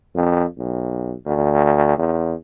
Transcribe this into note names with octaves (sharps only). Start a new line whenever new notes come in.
F2
B1
D2
E2